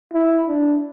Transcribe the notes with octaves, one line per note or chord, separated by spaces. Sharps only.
E4
D4